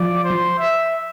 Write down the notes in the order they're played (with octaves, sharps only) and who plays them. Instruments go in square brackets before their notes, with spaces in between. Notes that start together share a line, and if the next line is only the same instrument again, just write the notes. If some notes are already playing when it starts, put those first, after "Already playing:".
Already playing: [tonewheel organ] F3 [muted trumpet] D5
[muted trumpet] C5
E5